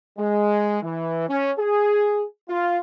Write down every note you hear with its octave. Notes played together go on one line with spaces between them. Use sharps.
G#3
E3
C#4
G#4
F4